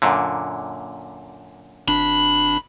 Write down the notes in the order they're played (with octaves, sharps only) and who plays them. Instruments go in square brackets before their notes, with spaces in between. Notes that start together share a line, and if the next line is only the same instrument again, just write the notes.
[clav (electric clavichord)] F#2 A#2 D3
[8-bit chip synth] G#1 D4 [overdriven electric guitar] B5